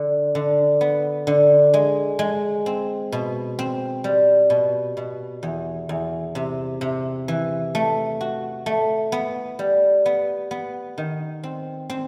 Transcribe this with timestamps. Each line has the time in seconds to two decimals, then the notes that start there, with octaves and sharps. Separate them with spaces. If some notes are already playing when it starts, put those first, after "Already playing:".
Already playing: D3
0.35 D3
0.81 B3
1.27 D3
1.74 G#3
2.19 G#3
2.66 C4
3.12 B2
3.59 C4
4.04 G3
4.50 B2
4.97 B2
5.43 E2
5.89 E2
6.35 C3
6.81 C3
7.28 E3
7.75 A3
8.21 F#4
8.66 A3
9.12 B3
9.59 G3
10.06 B3
10.51 B3
10.98 D#3
11.44 C4
11.90 C4